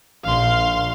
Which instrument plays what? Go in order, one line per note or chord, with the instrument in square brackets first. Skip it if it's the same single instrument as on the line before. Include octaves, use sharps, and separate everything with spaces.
[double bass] A#1 [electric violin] F5 C6